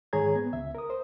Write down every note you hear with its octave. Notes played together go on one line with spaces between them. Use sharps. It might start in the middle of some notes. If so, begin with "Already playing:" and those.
G#2 D#3 G#4 C#5 A#5 G#6
B3
C#2 E5
A#4 D#6
C5